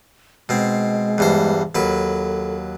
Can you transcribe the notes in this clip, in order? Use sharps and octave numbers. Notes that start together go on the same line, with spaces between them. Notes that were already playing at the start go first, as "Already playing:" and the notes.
B2 G#3 C4
E2 G2 C5
D#2 F#3 A4 B4